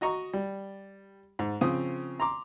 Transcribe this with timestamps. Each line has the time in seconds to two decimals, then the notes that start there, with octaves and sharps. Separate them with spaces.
0.01 F#4 D#5 A#5 C#6
0.33 G3
1.39 G#2
1.61 C#3 F3 C4 D#6
2.20 A#5 C6 D6